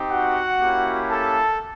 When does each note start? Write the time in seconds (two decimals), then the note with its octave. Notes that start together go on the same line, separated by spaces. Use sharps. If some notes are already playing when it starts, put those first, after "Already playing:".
Already playing: C4 D#4 G4
0.11 F#4 F#5
0.60 A#3 C#4 E4 G4
1.11 A4 A5